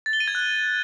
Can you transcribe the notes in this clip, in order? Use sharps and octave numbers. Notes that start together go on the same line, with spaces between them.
A6
G7
D#7
G#6
F#6